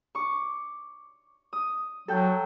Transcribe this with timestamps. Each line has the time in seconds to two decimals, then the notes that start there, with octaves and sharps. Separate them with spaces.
0.15 C#6 D6
1.53 D#6
2.08 F#3 A4 G5 G6